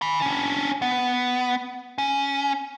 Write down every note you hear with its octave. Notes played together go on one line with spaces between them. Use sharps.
G#5 B5
C#4 D4
B3
C#4